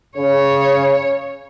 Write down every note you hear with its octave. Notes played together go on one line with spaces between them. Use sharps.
C#3 C#5